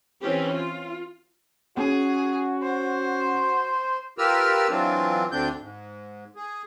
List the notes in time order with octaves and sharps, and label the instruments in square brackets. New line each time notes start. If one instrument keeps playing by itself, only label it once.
[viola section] E3 C4 C#4 G4
F4
[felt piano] C#4 [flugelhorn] F#4 [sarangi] G#4
[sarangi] C5
[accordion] F4 G4 A#4 B4 E6 F6
E3 F#3 C4 D4 F4
D2 D3 C4 D4 G6
G#2
G#4